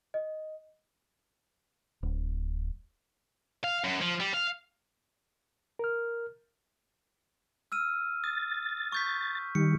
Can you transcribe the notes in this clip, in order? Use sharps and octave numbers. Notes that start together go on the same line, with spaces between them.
D#5
D1
F5
F#2
F3
G3
F5
A#4 F6
E6 F6 D#7
D#6 A6
C#6 G6 B6
D#3 G3 C#7